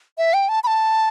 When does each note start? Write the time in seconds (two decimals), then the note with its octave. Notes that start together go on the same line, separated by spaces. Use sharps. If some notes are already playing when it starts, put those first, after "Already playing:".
0.18 E5
0.34 G5
0.49 A5
0.64 B5
0.67 A5